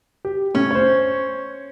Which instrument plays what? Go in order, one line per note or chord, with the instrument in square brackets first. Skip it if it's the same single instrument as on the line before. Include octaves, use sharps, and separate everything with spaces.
[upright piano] G4
[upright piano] A2 [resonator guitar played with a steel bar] C#4
[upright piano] C5 C#5